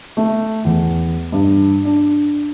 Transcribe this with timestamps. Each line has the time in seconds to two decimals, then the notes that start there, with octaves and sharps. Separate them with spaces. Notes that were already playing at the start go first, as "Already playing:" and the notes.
0.17 A3
0.65 E2
1.32 G2
1.85 D4